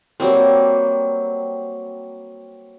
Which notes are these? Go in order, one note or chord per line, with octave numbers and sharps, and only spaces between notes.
F#3 G3 A#3 C4